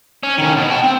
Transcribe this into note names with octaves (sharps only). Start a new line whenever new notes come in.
C#4
D#3 C#4
B2
G5 A5
C4